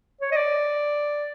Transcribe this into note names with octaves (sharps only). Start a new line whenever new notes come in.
C#5
D#5
D5